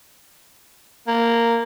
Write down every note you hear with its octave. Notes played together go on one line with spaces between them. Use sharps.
A#3